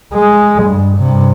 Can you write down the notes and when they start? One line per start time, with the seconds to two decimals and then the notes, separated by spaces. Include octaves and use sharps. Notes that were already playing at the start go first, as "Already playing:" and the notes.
0.14 G#3
0.64 G2
0.99 G2 C3